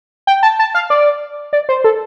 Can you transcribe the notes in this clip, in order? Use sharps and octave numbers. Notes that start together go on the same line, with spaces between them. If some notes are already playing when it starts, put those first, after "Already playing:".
G5
A5
A5
F5
D5
D5
C5
A4